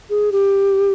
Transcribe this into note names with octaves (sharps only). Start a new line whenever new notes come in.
G#4
G4